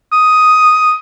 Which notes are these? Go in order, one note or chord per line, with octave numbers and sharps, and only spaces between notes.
D#6